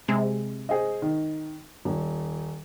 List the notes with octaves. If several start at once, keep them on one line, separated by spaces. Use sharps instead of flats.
C3 G#3
G#4 C5 D#5
D#3
D#1